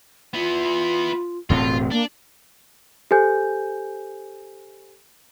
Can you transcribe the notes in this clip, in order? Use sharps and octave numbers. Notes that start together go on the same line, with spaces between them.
B3 E4 F4
E1 A2 C4 F4
A#3 D4
G4 A4 C5 G#5 G6